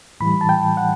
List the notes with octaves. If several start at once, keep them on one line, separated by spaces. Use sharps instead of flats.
A2 E3 G3 B5
A5
G5
F#5